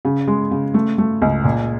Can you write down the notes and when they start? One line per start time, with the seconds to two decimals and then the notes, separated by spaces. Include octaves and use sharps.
0.05 C#3
0.27 G#3
0.51 C#3
0.74 A3
0.98 A3
1.22 C#2
1.44 A#2